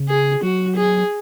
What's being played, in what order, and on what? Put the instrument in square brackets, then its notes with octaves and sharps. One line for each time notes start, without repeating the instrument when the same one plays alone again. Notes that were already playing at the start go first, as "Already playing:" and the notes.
Already playing: [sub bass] C#3
[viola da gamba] G#4
[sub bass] F#3 [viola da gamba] F#4
[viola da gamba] G#4